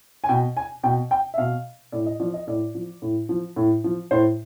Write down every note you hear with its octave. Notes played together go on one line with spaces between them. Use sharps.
G#5
B2 G5
G#5
B2 G5
G5
E5
B2 F5
A2 D5
D#5
F3 D5
D#5
A2 D5
F3
A2
F3
A2
F3
A2 C5